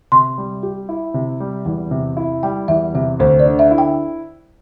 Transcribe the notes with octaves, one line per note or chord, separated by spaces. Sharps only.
C3 C6
G3
G4
E4
C3
G3
E2
C3
E4
G3 G5
E2 E5
C3 E5
D2 C5
D5
D3
E5
E4
G5